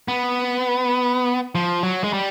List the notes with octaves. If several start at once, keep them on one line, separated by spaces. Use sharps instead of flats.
B3
F3
F#3
G#3
G3